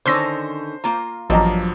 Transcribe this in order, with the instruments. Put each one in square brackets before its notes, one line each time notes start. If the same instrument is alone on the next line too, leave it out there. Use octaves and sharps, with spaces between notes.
[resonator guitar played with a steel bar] D3 D#3 C#4 [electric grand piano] C5 [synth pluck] C6 E6 A#6
[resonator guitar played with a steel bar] A#3 F4 A#5
[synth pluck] A1 [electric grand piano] G2 F3 F#3 [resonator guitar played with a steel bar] A#3 [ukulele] D5 D#5 A#5